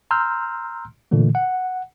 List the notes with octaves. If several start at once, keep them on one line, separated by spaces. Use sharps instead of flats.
A#5 C6 E6 F6 G6
A#2 D3 E3 A3
F#5